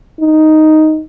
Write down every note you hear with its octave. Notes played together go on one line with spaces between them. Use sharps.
D#4